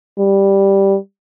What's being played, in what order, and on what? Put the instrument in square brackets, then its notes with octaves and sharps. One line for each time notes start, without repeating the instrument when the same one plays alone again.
[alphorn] G3